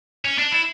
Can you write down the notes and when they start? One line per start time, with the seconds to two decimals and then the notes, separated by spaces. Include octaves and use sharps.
0.25 C#4
0.38 D4
0.52 E4